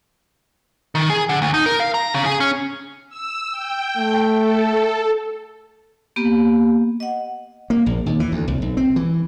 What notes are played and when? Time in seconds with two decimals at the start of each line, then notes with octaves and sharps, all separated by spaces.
0.95 D#3
1.10 G#4
1.29 D3
1.42 D2
1.54 D#4
1.66 A#4
1.80 F5
1.94 A#5
2.14 C#3
2.26 G#4
2.40 C#4
3.09 E6
3.51 G5
3.98 A3
4.36 A4
6.16 A#3 B3 G4
7.00 D#5 F#5
7.70 A#3
7.86 A#1
8.06 D#2
8.20 E3
8.32 D2
8.48 C2
8.62 B1
8.77 C4
8.96 E3